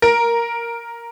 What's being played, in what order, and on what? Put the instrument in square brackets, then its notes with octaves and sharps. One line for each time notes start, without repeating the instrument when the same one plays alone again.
[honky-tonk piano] A#4